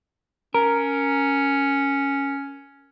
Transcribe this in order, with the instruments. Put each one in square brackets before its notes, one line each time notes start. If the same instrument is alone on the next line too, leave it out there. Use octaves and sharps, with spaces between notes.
[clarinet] C#4 [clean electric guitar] A#4